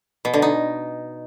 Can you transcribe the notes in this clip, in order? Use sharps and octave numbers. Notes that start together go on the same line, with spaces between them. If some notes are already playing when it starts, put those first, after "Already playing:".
B2
D3
D#4